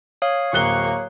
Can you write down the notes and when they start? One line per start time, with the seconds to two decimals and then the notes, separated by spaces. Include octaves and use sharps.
0.22 C#5 F5 D#6
0.53 D1 A#3 C#6 F#6 G7